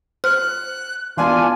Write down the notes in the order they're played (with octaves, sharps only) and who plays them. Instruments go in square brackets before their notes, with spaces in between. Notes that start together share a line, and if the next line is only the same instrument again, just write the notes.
[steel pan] C5 [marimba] F6 [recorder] F#6
[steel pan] E3 B3 [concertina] D4 F4 [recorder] G#5